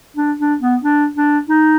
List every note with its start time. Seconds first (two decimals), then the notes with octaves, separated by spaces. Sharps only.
0.17 D4
0.39 D4
0.60 B3
0.83 D4
1.16 D4
1.49 D#4